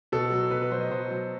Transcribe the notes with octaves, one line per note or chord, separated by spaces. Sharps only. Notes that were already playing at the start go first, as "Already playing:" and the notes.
B2 A4
F#3
B2 B4
B4
F#3 C5
D#5
B2 C5
F#3